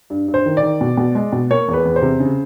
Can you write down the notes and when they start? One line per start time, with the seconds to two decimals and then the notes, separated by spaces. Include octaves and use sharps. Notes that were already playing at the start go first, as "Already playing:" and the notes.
0.10 G2
0.28 G2
0.34 C5
0.46 D#3
0.57 D5
0.63 D#3
0.81 B2
0.97 B2
1.15 G#3
1.33 B2
1.51 A#3 C#5
1.68 E2
1.73 B4
1.85 E2
1.96 C5
2.02 C3
2.20 C#3